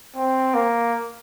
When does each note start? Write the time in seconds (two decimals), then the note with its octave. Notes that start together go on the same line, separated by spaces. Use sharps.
0.15 C4
0.54 A#3